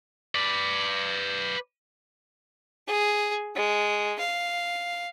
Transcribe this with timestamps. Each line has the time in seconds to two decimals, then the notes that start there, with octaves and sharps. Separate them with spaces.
0.35 B4 D5
2.88 G#4
3.56 G#3
4.20 F5